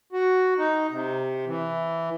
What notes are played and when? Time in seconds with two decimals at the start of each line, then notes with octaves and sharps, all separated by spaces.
0.13 F#4
0.58 D#4
0.91 C3
1.46 E3